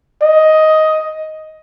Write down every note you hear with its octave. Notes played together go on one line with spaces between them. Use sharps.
D#5